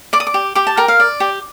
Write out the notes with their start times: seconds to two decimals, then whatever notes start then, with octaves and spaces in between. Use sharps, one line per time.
0.13 D5 D6
0.20 D#6
0.27 D6
0.34 G4
0.55 G4 D6
0.67 A5
0.77 A#4 G5
0.88 F5
1.00 D5
1.20 G4